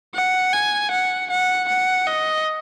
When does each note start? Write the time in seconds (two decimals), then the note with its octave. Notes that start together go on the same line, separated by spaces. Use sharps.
0.14 F#5
0.53 G#5
0.91 F#5
1.30 F#5
1.69 F#5
2.07 D#5